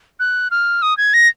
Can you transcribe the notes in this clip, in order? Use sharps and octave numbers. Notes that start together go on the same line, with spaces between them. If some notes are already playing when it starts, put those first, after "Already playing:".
F#6
F6
D#6
G#6
A#6